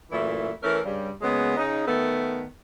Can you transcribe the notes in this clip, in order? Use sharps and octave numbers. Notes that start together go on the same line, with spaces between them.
F#2 A#2 E3 A3 E4
E3 A3 C#4 A#4
G2 C#3 G3
C#3 F#3 G#3 A#3 B3
C#3 D#4
D#3 A3 B3